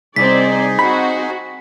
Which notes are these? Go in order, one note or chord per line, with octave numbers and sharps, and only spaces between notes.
C2 C4 D#4 G#4 D5 B6
C4 F#4 B5